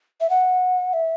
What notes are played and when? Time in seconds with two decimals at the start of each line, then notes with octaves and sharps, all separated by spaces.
0.21 E5
0.30 F#5
0.93 E5